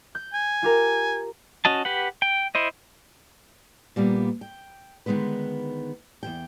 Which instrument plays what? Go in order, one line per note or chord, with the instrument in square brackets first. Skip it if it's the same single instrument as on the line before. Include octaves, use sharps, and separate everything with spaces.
[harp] G6
[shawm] G#5
[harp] F4 G4 A#4
[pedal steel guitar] C#4 F#4 D#5 A5
G4 B4 F#5
G5
E4 C5 D#5
[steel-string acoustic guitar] A#2 G3 A#3 B3
G5
D3 D#3 F#3 G#3 B3 B4
E2 G2 G5